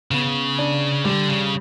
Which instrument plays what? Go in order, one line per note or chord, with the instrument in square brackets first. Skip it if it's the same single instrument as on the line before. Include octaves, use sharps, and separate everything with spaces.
[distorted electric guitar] C#3 [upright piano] B3
[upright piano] D4
[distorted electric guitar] D3 [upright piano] G3
[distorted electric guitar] C#3